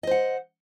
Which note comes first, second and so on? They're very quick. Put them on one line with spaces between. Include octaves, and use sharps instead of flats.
D#5 C5 F#5